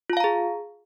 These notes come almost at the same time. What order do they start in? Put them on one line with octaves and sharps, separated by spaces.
F4 A5 F5 A#5 G#4